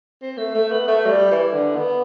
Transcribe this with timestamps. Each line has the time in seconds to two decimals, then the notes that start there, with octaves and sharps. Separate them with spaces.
0.22 C4
0.38 A3
0.55 A3
0.71 B3
0.88 A3
1.05 F#3
1.09 G3
1.31 E3
1.53 D3
1.76 B3